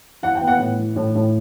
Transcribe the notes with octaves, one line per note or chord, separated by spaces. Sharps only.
E3 F#5
G5
B3
F#5
A2
E3
A2
A2